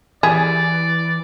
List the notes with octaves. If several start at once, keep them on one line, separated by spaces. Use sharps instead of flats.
E3 G4 G#4 D5